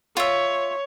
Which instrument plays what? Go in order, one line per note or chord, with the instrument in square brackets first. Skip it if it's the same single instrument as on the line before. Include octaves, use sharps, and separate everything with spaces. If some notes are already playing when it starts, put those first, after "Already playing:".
[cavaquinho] F4 E5 [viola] C#5